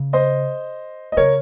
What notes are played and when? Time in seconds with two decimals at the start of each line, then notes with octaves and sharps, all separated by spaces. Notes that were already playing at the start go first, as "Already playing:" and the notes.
Already playing: C#3
0.13 C5 D#5
1.12 D#5
1.17 C#3 A#4 C#5